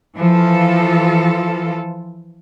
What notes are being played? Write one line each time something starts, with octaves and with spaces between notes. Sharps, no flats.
E3 F3 F4 A4